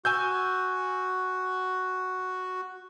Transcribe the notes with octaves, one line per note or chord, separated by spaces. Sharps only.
F#4 G#5 E6 G6